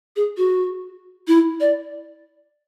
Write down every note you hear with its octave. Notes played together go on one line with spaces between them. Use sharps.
G#4
F#4
E4
D5